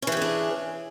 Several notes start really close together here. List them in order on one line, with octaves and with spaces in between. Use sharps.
C#4 E3 G4 G#4 D4